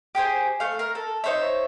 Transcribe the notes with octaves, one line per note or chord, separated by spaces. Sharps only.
G4 G#4 C5 G#5
A3 F5
A#4
A4
D#4 C5 C#5 E5